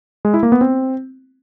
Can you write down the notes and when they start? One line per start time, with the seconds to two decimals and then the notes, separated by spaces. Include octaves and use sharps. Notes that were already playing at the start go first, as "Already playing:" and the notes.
0.25 G#3
0.34 E4
0.43 A#3
0.52 B3
0.61 C4